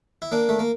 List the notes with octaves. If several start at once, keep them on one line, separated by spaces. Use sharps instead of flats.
E4
A#3 D4
A3
A#3